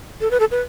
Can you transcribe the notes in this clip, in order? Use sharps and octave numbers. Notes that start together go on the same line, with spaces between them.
A4
B4
A4
B4